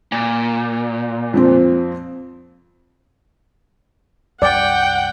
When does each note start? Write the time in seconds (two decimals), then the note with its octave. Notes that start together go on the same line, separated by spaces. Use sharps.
0.12 A#2
1.34 F2 F3 C4
4.42 C2 F#2 G3 D5 F#5 G5